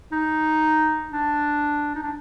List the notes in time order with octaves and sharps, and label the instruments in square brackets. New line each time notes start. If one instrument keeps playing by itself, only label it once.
[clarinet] D#4
D4
D#4
D4